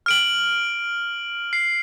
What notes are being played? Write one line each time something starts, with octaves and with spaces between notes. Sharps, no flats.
F6 D7 F#7
C7